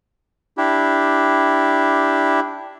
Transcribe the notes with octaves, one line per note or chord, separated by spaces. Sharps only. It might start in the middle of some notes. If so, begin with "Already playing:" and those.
D4 E4 G4